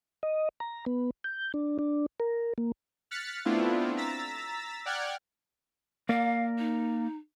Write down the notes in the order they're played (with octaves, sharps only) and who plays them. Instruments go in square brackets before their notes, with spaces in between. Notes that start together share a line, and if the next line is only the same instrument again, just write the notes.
[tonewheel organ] D#5
A#5
B3
G6
D4
D4
A#4
A#3
[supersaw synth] F6 F#6 A6 B6 C#7
A3 B3 C4 D4 E4 F4
A#5 E6 A6 B6
D5 F#5 G5 F6 F#6 G#6
[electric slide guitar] A#3 A#4 D5 [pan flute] F5
[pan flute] D#4